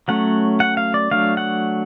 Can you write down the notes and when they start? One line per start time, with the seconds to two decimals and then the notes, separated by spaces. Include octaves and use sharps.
0.08 F#3 A3 C#4 F#5
0.60 F#5
0.77 F5
0.94 D5
1.11 F#3 A3 D4 F5
1.37 F#5